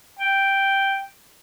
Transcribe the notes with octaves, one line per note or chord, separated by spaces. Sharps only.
G5